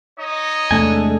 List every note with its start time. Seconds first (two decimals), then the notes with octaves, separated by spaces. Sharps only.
0.18 D#4 C#5 D#5
0.71 E2 C3 G#3 A3 D4 A4 G#5